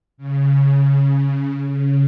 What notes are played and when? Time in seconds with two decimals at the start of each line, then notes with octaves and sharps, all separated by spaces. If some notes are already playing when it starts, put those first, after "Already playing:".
0.17 C#3
1.68 C#3